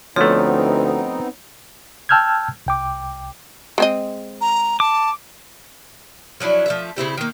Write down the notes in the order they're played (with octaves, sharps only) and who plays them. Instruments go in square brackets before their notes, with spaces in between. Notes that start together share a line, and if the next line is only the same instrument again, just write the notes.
[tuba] D2 [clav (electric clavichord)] F3 A3 [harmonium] B3 C4 D#4 [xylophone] C#5
[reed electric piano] G5 A5 E6 F6 G6 G#6
C2 G5 D6
[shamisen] G#3 C4 D#5
[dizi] A#5
[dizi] A5 [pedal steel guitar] D6
[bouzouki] F3 F#3 D4 E4
F3 A3 E5
C#3 C4 E4 G4
D#3 A#3